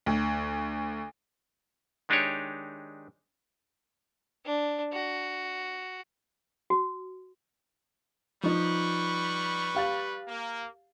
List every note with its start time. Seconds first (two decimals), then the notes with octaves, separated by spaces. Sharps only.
0.06 D2
2.09 D#3 G#3 D4 D#4 G4 C#5
4.46 D4
4.93 F#4
6.70 F#4
8.43 F3 G3 D#4 B4 C#6
9.75 G4 F5 A6
10.28 A#3